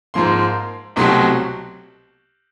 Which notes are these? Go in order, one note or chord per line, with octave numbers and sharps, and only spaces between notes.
G#2 F3 A#3 C6
C2 B2 F#3 A3 C4 C6